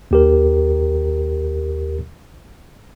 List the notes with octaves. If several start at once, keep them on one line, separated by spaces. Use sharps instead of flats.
D#2 G4 A#4